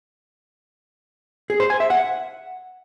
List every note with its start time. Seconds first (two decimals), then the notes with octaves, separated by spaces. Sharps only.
1.50 G#4
1.60 C5
1.70 G#5
1.80 E5
1.90 F#5